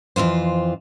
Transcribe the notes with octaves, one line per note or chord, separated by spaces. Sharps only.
F2 E3 F4 C5